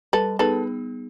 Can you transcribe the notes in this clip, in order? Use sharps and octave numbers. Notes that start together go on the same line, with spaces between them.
G3 A4 B4
B3 D#4 G#4 A4 B4